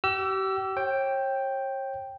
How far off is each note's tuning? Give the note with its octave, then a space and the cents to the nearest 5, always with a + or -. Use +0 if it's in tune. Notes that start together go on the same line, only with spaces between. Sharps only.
G4 -35 E6 +20
C#5 -40 G5 +0